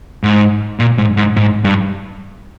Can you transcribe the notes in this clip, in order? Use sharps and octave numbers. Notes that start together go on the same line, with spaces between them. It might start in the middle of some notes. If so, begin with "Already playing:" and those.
G#2
A#2
G#2
G#2
G#2
G2